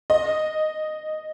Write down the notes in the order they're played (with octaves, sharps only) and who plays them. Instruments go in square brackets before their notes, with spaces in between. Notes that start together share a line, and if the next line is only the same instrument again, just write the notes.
[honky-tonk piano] D#5